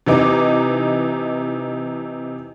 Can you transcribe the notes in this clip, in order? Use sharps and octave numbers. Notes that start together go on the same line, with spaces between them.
C3 E3 D#4 D6